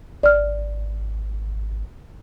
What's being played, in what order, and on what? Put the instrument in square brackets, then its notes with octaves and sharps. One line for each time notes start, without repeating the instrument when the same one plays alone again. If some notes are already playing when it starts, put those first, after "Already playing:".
[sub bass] G#1 [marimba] D5 F6